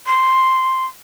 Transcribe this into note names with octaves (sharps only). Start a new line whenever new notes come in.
C6